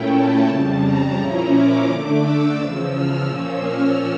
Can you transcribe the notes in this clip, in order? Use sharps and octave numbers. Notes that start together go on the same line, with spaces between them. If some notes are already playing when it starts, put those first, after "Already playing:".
Already playing: A#2 A3 C#4 E4 G5
A5
F2 C#3 G3 A5
A#5
A#2 F3 C#4 E4
D6
D3 A3 D4
E6
E2 C#3 F3
F6
A#2 F3 A#3 C#4 E6
F6